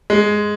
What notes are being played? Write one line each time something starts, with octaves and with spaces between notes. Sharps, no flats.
G#3